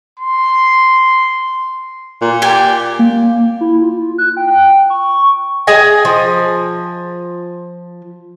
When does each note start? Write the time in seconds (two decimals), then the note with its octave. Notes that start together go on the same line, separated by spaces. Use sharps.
0.19 C6
2.22 A#2
2.42 G4 D5 G#5
2.99 A#3
3.61 E4
3.82 F4
4.18 F#6
4.37 G5
4.90 C#6
5.67 G#4 D#5 G#5
6.05 F3